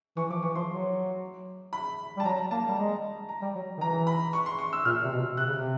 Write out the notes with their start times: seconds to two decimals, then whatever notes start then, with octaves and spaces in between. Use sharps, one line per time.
0.17 E3 C#6
0.30 F3 D6
0.43 E3 C#6
0.55 F3 C6
0.69 F#3
1.73 B5
2.17 G3
2.20 A5
2.24 F#3 A#5
2.51 A#3 A5
2.68 G3
2.77 G#3 A#5
3.29 A#5
3.42 G3
3.55 F#3
3.78 D#3
3.81 E3 A#5
4.07 B5
4.33 C#6
4.46 C6
4.59 C#6
4.73 E6
4.85 A#2 F6
5.04 C3
5.11 B2
5.37 C3 F#6
5.45 C#3
5.54 C3